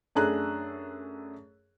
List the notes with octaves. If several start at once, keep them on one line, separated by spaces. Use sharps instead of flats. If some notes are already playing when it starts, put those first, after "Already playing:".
F#2 A3 D4 G#4 A#5 F#6